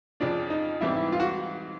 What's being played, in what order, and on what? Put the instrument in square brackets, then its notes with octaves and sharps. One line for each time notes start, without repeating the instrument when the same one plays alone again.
[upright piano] F2 C#3 F3 [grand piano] D4
[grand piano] D#4
[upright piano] G#2 E3 G3 C4 [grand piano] E4
[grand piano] E4
F4
F#4